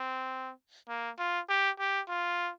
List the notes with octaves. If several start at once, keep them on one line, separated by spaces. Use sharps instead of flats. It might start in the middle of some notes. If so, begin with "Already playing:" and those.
Already playing: C4
A#3
F4
G4
G4
F4